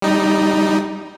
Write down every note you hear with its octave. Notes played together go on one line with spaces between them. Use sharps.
G3 D#4